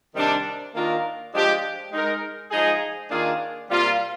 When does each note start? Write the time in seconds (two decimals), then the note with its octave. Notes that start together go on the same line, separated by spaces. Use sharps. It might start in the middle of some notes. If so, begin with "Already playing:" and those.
0.15 C3 D#3 G3 D4
0.74 D#3 A#3 D4 F4 A#4
1.32 F3 G#3 D4 G4
1.92 G#3 D#4 A#4
2.51 F3 G#3 D#4 G#4
3.11 D#3 A#3 D4 F4 G#4
3.69 C3 G3 A#3 F4 C5